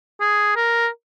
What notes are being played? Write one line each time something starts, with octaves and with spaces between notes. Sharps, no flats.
G#4
A#4